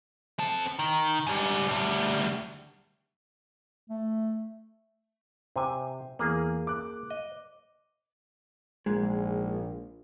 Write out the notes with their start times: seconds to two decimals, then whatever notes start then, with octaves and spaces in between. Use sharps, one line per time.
0.39 C4 A4
0.79 D#3
1.27 G#2 G3
1.69 D2 G3
3.90 A3
5.56 C3 C5 G#5
6.19 E2 A#3 G#4
6.67 D6 F#6
7.10 D#5
8.86 A#1 G#2 G#3